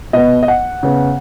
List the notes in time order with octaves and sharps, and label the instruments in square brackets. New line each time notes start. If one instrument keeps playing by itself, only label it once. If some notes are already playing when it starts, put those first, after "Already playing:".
[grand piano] B2 B3 D#5
D#5
F#5
C#3 B3